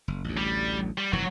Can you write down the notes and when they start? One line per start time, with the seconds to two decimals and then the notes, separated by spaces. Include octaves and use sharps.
0.08 F#1
0.24 A1 D2
0.37 G3
0.98 G3
1.13 F1 G2 E3 F#3 F#4